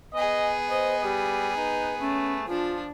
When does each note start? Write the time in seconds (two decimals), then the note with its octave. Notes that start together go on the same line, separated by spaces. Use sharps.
0.14 B3 G#4 D#5 G#5
0.70 C5 D#5
1.03 G3 G4
1.56 D#4 B4
2.00 A3 C#4
2.48 F3 D4 F4